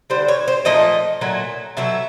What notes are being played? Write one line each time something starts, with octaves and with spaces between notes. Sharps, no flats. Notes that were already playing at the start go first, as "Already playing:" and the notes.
D3 G3 C5
C#5
C5
A#2 F3 A3 D#5
A#2 F#3 A3
B2 F#3 A3 E5